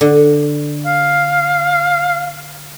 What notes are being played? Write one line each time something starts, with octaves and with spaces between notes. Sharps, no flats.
D3
F5